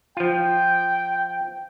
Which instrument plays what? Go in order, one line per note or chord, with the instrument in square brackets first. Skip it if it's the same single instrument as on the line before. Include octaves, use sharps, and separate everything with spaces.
[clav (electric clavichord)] F3 F4 [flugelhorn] G5